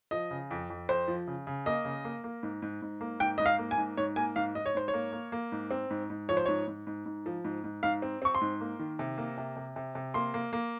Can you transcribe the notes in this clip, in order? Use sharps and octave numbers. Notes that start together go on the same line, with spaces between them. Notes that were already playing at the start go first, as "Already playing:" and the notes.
F3 D#5
C#3
F2
F2
F2 C5
F3
C#3
C#3
A#3 D#5
C#3
A#3
A#3
G#2
G#2
G#2
A#3
G#2 G5
G#2 D#5
F5
A#3
G#5
G#2
G#2 C#5
A#3 G#5
G#2 F5
G#2 D#5
C#5
G#2 C5
C#5
A#3
A#3
A#3
G#2
C4
G#2
G#2
F3 C#5
C5
G#2 C#5
G#2
G#2
G#2
F3
G#2
G#2
G#2 F5
C4
C4 C#6
C6
G#2
A#3
D#3
C3
A#3
C3
C3
C3
C3
A#3 C6
A#3
A#3